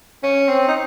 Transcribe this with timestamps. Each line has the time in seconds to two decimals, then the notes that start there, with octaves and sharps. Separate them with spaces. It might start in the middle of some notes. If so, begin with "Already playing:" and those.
0.23 C#4
0.48 C4
0.68 D#4